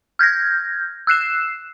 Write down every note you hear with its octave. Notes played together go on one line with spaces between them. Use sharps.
F6 G6 G#6 A#6
E6 F#6 C7 E7